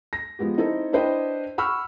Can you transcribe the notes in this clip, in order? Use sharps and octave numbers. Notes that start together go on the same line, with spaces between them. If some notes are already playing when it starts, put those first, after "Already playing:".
A#6
F3 G#3 B3 G4
C4 D#4 E4 A4
D4 E4 B4 C5 D#5 G5
F#5 B5 C#6 E6 F6